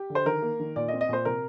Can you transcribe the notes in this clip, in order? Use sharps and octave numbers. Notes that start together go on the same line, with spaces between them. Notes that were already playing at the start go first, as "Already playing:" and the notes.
Already playing: G4
D3
C5
D#3 A#4
A#3
D#3
A#2 D5
D#5
C4
D#5
A#2 C5
C3 A#4